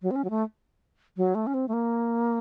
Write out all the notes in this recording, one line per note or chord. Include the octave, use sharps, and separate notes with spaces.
F#3
C4
C#4
F#3
A3
F#3
A3
C#4
C4
A3
A#3